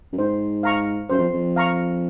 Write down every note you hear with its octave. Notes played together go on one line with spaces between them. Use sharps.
F#2
G#2 C5
F5 A#5 C#6
F#2 C5
F2
F2
F5 A#5 C#6